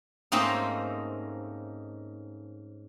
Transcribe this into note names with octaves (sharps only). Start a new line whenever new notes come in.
G#2 A3 A#3 C4 C#4 D#4